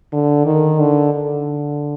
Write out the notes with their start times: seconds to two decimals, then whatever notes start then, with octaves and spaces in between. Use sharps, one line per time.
0.12 D3
0.46 D#3
0.80 D3
1.14 D3